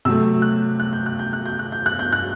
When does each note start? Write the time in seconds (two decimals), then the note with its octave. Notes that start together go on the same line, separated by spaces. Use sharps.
0.05 C3 F#3 A3 E6
0.42 F#6
0.80 F#6
0.93 G6
1.06 F#6
1.19 G6
1.33 F#6
1.46 G6
1.59 F#6
1.72 G6
1.86 F#6
1.99 G6
2.13 F#6